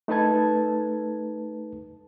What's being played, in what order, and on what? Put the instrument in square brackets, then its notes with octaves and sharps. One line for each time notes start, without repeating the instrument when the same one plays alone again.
[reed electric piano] A3 D#4 A4 B4 A5 G#6